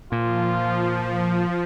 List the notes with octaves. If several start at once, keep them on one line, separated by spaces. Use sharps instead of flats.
A#2 F3 F4